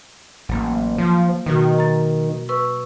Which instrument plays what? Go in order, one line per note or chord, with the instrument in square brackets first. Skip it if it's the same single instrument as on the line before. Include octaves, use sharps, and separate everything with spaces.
[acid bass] A1 [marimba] F#3 A#3
[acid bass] F3
[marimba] B2 F#4 [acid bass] D#3
[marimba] A#5 A6
B4 C#6 E6